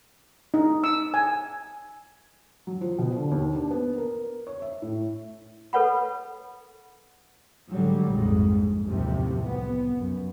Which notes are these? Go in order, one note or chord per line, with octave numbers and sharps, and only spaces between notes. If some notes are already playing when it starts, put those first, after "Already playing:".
D#4
E6
G#5
F#3
F3
B2
D3
D#2
D4
B3
A#4
C#5
E5
A2
A4 B4 C#5 F#5 B5
G#2 D3 F#3 G3
A#1 F2 G#2
F#1 D#2 A2 C3 F3
C2 B3
F#2